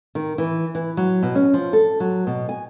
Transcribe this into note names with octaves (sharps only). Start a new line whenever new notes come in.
D#3
E3
E3
F#3
B2
C#4
F3
A4
F#3
B2
G#5